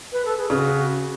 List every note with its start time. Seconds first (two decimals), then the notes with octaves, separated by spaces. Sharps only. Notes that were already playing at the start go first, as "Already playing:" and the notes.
0.13 B4
0.25 A4
0.37 G#4
0.50 C#3 G#4
0.55 F#4